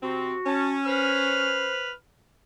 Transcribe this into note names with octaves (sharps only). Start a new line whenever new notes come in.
C3 C4 F#4
C#4 A5
B4 C5 F6